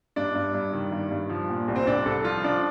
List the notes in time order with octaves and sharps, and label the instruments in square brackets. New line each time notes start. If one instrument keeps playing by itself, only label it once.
[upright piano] G2 D4
G2
G2
D#3
G2
G2
F3
A#2
C2
C4
C2 D4
C2 A4
F3 F4
F3 D4